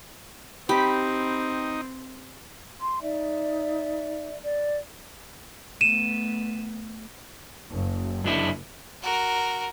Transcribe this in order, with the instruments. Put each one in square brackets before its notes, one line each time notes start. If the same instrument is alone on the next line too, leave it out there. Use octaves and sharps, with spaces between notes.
[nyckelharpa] C4 [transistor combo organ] D#4 [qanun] G4 [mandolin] B5
[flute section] C6
[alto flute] D#4 [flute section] D5 E5
[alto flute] D5
[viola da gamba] A3 B3 [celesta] D#7 E7
[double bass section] F#1
[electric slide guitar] F#2 D4 E4
[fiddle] F#4 A#4